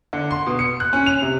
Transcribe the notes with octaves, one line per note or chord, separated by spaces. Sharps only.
D3
C6
B2
C#7
F#6
C#4
F7
C3